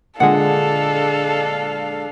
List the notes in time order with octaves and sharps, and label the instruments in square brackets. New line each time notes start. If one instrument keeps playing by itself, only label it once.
[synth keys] A#2 D3 G#3 [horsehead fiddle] D4 F5 [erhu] A4 [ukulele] F#5